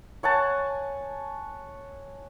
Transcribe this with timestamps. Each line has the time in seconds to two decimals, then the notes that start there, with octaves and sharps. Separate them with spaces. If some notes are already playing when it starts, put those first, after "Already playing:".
0.23 C#5 F#5 G#5 A5